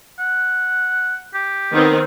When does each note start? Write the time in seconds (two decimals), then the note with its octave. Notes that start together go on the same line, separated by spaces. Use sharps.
0.19 F#5
1.34 G4
1.72 D#3 B3 C4